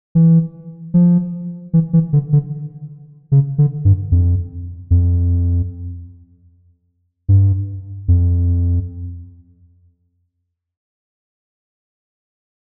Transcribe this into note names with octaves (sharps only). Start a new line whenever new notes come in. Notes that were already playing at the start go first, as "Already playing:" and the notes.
E3
F3
E3
E3
D3
D3
C#3
D3
G2
F2
F2
G2
F2